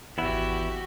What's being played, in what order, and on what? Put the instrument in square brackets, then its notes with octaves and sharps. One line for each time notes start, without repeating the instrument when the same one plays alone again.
[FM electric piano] G#1 F#5 E6 [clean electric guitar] E2 B3 E4 [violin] F#4 G4